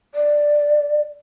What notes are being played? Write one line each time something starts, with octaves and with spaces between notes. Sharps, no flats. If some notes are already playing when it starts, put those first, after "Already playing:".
D5